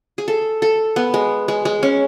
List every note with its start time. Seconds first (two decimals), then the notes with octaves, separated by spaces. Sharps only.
0.18 G#4
0.28 A4
0.62 A4
0.96 B3
1.14 G#3
1.48 G#3
1.65 G#3
1.83 C#4